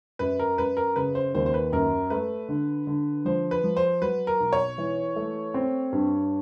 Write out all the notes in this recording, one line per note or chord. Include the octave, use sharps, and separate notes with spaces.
F#2 B4
A#4
F#2 B4
A#4
C#3 B4
C5
D#2 C5
C5
B4
F#2 A#4
A3 B4
D3
D3
F3 C5
B4
F3
C5
F#3 B4
A#4
B1
C#5
E3
A3
C4
G2